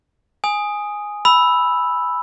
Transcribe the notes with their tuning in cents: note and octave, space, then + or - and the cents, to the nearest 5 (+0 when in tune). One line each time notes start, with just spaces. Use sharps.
G#5 +0 D#6 +0
B5 +0 E6 +0